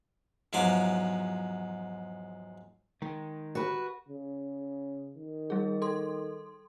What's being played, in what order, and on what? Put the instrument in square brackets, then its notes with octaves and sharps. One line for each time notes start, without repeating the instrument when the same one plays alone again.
[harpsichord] E2 G#2 F3 F#3 C6 D6
[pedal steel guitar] D#3 [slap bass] G#3
[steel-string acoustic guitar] F#4 B4
[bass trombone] C#3
D#3
[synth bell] G3 G#4
A4 C6